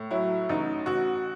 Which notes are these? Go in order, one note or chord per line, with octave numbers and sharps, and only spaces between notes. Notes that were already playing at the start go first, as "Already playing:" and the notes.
Already playing: A2
F#3 E4
A1 D#4
A1 F#4